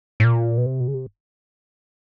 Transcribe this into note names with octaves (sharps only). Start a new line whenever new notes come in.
A2
A#2
B2
C3
B2
C#3
C3